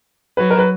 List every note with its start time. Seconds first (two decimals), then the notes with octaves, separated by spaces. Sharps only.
0.37 F#3 B4
0.50 A#4
0.59 B4